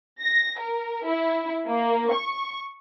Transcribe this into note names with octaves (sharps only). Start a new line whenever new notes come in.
A#6
A#4
E4
A#3
C#6